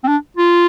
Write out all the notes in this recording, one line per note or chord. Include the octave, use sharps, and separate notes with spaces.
C4
D4
F4